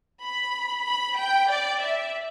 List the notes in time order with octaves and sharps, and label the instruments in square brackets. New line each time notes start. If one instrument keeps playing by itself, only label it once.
[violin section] B5
B5
G5
D5
E5